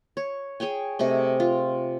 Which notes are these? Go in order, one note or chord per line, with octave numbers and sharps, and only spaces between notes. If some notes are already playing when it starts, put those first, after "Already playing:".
C#5
G#4 C#5 G5 G#5
C3 A3 G#4 D#5
F4